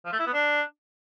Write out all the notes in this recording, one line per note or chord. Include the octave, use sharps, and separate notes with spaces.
F3
A3
E4
B3
D4